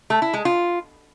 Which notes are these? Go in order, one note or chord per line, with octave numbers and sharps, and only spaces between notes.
A3
E4
G#3
F4